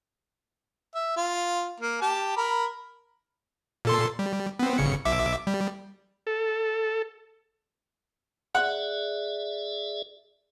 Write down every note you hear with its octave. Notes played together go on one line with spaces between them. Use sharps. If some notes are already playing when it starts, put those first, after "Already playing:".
E5
F4
A#3
G4 A5
A#4 B5
A#2 A4 C6
G3
B3 C4
G1 C#3 C#7
B1 E5 D6
G3
A4
G#4 D5 E5 F#5